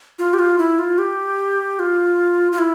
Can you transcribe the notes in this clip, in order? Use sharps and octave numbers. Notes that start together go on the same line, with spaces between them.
F4
G4
F4
E4
F4
G4
F4
F4
E4